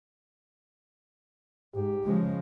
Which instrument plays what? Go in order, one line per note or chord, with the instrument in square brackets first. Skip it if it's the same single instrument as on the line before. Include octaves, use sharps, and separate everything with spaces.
[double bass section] G#2 [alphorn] G4
[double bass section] C#3 F3 G#3